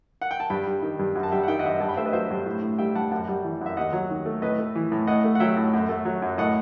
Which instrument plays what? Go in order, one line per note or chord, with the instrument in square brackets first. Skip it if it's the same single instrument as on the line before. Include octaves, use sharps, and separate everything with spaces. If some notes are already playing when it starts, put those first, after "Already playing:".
[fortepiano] F#5
G5
A5
G2 G5 B5
G3
D#3
G2
F#2
A5
G3 E5 G5
F#5
D#3 E5 G5
D#5 F#5
F#2 E5
D#5 F#5
G2 F#5 A5
G5 B5
A3 C5 E5
B4 D#5
F#3 C5 E5
G2
A2
A2
G3 E5 G5
G3 F#5 A5
F#2 F#5 A5
G3
E3
F#2 E5
D#2 D#5 F#5
F#3
D#3
A3
A2 B4 D#5
A3
E3
A2
A2 D#5 F#5
A3
F#5
F#3 E5 G5
A2
F#2
A3
F#3
F#2
A2 D#5 F#5